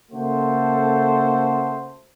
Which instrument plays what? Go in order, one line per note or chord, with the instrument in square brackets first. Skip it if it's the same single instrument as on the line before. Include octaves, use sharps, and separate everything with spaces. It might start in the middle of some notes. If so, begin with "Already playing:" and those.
[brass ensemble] C#3 A3 A#3 F#4 A4 C5